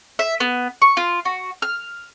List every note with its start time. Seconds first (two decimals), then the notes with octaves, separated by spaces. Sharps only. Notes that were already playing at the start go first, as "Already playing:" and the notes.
0.19 E5
0.40 B3
0.82 C#6
0.97 F4
1.25 F#4
1.62 F6